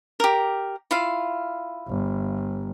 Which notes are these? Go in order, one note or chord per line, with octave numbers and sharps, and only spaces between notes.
G4 A#4
E4 F4 F5
G1